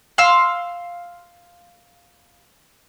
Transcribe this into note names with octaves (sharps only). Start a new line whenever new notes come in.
F5 C6 E6